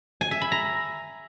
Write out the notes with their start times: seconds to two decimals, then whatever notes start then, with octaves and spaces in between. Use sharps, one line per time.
0.21 G#5
0.31 E5
0.41 B5
0.52 A#5